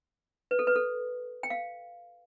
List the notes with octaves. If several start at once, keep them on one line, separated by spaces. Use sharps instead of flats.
B4
A4
B4
A4
G5
F5